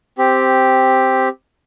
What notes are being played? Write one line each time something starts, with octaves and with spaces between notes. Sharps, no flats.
C4 G4